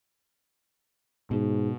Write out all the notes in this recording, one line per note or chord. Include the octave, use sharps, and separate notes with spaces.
G#2 B2